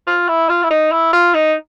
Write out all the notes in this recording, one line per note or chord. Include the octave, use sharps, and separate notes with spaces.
F4
E4
F4
E4
D#4
E4
F4
D#4